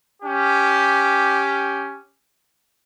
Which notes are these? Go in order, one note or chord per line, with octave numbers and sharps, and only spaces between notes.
C#4 G4